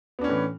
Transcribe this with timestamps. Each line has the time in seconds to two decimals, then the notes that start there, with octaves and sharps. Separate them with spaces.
0.19 B3
0.21 D4
0.24 C#4
0.27 A2
0.30 E3